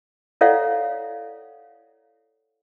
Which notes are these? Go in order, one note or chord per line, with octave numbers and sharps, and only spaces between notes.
E4 A4 C#5 D5 F5 F#5